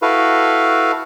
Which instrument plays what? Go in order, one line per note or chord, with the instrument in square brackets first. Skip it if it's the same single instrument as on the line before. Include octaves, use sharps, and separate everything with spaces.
[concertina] E4 F#4 A4 B4 F5